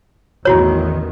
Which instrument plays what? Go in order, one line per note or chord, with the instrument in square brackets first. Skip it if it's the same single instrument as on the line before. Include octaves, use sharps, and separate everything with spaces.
[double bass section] A1 E2 D#3 [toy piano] E4 F#4 C#5